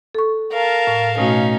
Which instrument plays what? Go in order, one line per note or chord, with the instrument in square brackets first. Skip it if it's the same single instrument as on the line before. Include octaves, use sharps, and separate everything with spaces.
[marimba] A4 C#6
[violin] A#4 A5 [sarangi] F5
[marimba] A2
[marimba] B2 A3 F#4 [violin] C#4 D#4